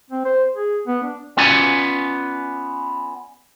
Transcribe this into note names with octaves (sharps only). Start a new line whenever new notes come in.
C4
C5
G#4
B3
D4
B3 C#4 F4 D5 G#5